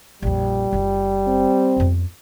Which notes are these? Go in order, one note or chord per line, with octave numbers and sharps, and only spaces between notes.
A#1 F2 G3
F#1 F4
C4
F2 B3